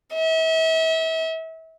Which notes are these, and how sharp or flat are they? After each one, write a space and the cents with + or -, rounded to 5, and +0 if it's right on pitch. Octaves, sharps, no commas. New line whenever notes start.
E5 -35